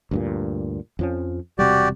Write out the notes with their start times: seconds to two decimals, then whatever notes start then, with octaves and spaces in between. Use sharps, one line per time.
0.11 D2 G2 A#2
0.99 F2 F3 C#4
1.59 E1 C3 G3 F#4 G4 D5